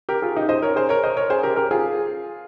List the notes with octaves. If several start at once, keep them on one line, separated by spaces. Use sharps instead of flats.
G4 A#4
F4 G#4
D#4 G4
C5 D#5
A#4 C#5
G#4 C5
A#4 C#5
C5 D#5
A#4 C#5
G#4 C5
G4 A#4
G4 A#4
F4 G#4